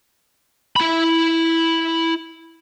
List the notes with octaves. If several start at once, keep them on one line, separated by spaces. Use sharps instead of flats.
E4 B5